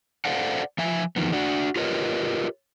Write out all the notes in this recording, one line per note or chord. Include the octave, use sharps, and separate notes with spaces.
A4 C5 D5 F5 F#5
F3 E5 G#5
E2 D#3 F3 B3
D4 F#4
F4 G4 A#4 B4 C#5 D#5